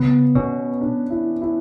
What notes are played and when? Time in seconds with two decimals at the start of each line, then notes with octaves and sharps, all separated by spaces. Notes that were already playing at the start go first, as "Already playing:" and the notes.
Already playing: C#3 B3
0.35 B2 C#4
0.81 D4
1.10 E4
1.42 E4